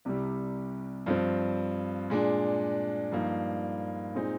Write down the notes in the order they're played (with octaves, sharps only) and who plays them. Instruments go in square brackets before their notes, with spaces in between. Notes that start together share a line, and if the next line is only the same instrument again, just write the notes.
[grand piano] C2 C3 G3
G2 F3 C4
A#2 G#3 D4
G2 F3 A#3 D#4
A#2 G#3 C4 D#4